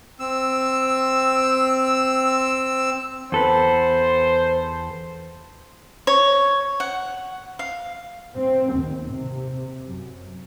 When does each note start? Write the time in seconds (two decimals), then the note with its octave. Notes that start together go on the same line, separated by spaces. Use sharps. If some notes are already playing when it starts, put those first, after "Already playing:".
0.20 C4 E6
3.32 E2 A4 B4 C5
6.07 C#5
6.80 F#5
7.59 F5
8.36 C4
8.75 D#2
9.13 C3
9.86 F#2